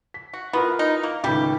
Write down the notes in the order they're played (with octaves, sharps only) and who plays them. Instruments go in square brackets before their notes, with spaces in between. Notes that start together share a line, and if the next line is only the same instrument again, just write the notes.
[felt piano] B6
[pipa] F#4
[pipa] B3 [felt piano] E4 F4 A#4
[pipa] D#4
A#3
[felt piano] C#2 A2 D#3 [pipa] G3 G4